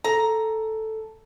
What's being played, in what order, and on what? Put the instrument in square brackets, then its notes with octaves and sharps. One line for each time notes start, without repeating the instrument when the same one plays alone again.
[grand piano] A4 [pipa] A#5